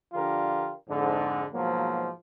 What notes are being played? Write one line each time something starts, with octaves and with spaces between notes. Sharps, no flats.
D3 F3 D4 F4 G4 A#4
F2 G#2 D3
G#2 B2 F3 F#3 A#3